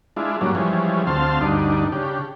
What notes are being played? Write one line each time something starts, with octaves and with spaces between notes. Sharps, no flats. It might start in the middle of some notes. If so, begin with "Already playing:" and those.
G#3 D4 E4 F4
G2 F#3 A#3 C#4 D4
E3 F3 G3 G#3 C#4
D2 C4 F5 A5 C6
D2 G2 D4 D#4
C#3 D4 G4